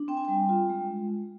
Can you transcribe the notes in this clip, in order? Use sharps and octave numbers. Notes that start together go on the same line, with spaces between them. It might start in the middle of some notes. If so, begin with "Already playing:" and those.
Already playing: D4
C4 G5
G#5
G3 G5
F4
G#3